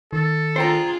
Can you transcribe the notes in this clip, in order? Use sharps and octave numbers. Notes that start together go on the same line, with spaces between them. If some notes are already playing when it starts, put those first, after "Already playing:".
D#3 A4
D4 F4 G#4 C5 G5 A#5